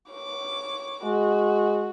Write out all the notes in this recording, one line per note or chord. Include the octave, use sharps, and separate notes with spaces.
C#5 D6
G#3 F#4